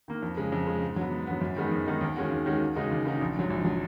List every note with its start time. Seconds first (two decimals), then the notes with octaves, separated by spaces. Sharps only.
0.08 D#3 A#3
0.22 F2
0.37 C#3 G#3
0.52 F2
0.67 C#3 G#3
0.82 G#2
0.96 F#3 B3
1.11 G#2
1.27 F#3 B3
1.41 F#2
1.57 D#3 G#3 B3 D#4
1.71 F#2
1.86 D#3 G#3 B3 D#4
2.01 D#2
2.16 D#3 G#3 C#4 F#4
2.31 D#2
2.46 D#3 G#3 C#4 F#4
2.60 D#2
2.75 C#3 G#3 D#4 F#4
2.91 D#2
3.05 C#3 G#3 D#4 F#4
3.21 A#1
3.36 G#2 F#3
3.50 A#1
3.65 F#3